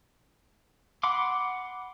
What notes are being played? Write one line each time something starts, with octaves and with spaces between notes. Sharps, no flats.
F#5 B5 C6 D6